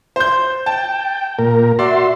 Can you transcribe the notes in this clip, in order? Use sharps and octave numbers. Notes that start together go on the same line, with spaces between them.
C5 G6
G5 A5
A#2 A#4
F#4 D5 E5 C6